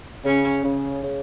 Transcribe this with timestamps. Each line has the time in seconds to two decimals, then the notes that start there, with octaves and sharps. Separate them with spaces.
0.24 C#3 C#4
0.64 C#3
1.02 C#3